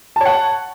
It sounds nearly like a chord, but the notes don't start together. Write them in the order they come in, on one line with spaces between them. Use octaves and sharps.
A5 C#5 F#5